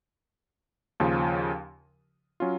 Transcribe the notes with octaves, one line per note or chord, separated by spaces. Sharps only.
D#2 C#3 F3
F#3 C#4 F4